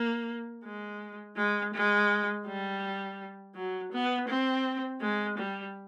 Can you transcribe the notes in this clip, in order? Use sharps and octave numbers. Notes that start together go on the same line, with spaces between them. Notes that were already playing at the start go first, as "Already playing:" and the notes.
Already playing: A#3
G#3
G#3
G#3
G3
F#3
B3
C4
G#3
G3